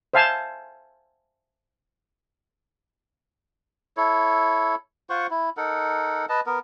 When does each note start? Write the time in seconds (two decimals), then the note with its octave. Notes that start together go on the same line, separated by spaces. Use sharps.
0.14 C5 E5 F5 G#5 A5
3.97 E4 A4 C#5
5.10 F4 C5 F#5 C#6
5.31 E4
5.57 D#4 A4 A#4 F#5
6.29 B4 D#5 A5
6.46 B3 A#4